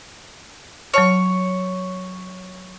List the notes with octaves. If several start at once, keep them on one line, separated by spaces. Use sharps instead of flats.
F#3 C#5 A5 F6